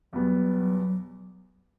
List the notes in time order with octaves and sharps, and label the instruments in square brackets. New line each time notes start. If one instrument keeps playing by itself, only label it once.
[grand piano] E2 B2 G3 B3 [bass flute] F#3